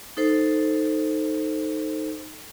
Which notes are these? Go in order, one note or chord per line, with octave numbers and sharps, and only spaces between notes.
D#4 A4 C5